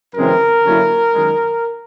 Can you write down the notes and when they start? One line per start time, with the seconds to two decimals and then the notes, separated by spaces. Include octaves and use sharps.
0.15 F#2 C#3 E3 G#3 C4 A#4
0.64 D3 F#3 A#3 C#4 E4
1.13 F#2 D#3 G#3